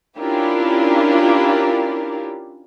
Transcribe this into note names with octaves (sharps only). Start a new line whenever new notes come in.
C#4 D4 E4 F4 G4 A#4